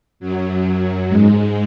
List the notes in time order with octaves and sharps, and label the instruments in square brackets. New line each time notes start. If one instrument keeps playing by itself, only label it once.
[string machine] F#2 F#3
G#2 G#3